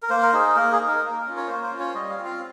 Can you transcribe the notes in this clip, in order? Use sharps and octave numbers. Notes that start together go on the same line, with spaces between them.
A#4
A#3 C5
A#4
D#4 G#4
A#3 A#4
G#4
D#4
A#4
A#3
C#4 F4
C#5
A#3 C5
C5
C#4 F4
C#5
G3 D#5
F5
C4 F4
F5